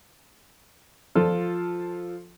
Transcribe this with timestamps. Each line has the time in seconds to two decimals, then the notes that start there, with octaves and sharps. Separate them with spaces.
1.15 F3 F4 A4